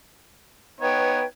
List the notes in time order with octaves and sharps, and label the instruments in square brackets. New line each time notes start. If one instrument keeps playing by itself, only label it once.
[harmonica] B3 D#4 C#5 [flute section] B4 G5 G#6